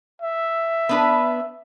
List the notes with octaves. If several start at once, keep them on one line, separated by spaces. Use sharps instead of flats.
E5
B3 D4 B4